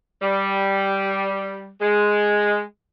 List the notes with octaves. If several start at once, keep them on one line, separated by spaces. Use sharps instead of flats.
G3
G#3